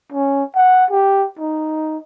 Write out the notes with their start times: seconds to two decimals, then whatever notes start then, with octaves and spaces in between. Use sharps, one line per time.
0.12 C#4
0.56 F#5
0.91 G4
1.39 D#4